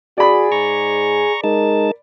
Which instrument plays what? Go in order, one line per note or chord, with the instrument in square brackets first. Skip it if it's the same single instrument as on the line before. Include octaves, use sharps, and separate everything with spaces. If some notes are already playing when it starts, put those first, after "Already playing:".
[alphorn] F#4 [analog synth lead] G#4 [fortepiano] D5 B5
[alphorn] G#2 [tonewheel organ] A#5 C#6
[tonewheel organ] G#3 D#4 A5 [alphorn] A#4